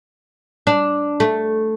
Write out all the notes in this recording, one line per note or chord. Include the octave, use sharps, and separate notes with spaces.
D4
A3